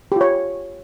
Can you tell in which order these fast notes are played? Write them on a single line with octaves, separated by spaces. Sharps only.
G4 F4 C#5